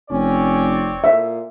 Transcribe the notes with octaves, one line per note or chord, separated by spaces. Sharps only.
F1 C4 C#4 C#5 D5
A#2 C5 E5